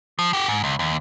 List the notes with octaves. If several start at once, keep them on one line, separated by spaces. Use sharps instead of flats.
F3
F#4 G4
G#2
C#2
D#2